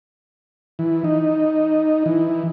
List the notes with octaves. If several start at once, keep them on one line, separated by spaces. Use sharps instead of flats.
E3
D#4
E3